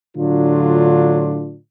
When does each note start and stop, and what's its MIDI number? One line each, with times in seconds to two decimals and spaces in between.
0.17 1.56 45
0.17 1.56 50
0.17 1.56 54
0.17 1.56 62
0.17 1.56 65